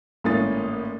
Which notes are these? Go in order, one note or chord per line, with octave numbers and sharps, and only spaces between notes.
G#1 A2 A#3 C#4 D#6 A6